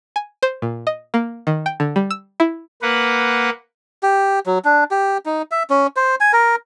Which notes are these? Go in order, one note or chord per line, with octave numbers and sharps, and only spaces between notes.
G#5
C5
A#2
D#5
A#3
D#3
G5
D3
G3
E6
E4
A#3 B4 F#5
G4
F#3
D4
G4
D#4
E5
C#4
C5
G#5
A#4